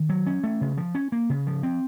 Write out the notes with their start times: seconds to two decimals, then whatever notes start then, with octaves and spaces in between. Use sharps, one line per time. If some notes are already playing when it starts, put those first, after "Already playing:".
Already playing: D#3
0.09 F#3
0.27 C#4
0.44 A3
0.61 C#3
0.77 F3
0.95 C#4
1.12 A#3
1.30 C#3
1.47 F3
1.63 C4